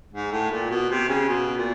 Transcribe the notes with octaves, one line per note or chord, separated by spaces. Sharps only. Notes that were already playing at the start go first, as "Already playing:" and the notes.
G#2
A2
A#2
B2
C3
C#3
B2
A#2